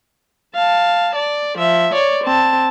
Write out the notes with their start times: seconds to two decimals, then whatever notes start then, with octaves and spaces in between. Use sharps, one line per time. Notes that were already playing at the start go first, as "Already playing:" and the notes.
0.55 F5 A5
1.15 D5
1.58 F3 E5
1.94 C#5 D5
2.24 C4 A5